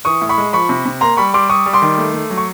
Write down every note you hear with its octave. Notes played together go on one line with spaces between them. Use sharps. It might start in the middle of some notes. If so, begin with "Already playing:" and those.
E3 C#6 D#6
A2
B5 C#6
G#3
F3 B5 C#6
C3
C3
A#3 A#5 C6
G3 B5 C#6
G3 C6 D6
G3 C#6 D#6
G3
C6 D6
D#3
A3
A3
F#3
C#6